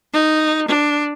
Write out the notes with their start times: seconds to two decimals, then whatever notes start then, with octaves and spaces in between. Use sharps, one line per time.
0.13 D#4
0.67 D4